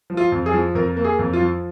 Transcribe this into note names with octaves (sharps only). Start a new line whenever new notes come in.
F3
F4
F2
G#4
F3
F2 A#4
A#3
G#4
F2
F4
F3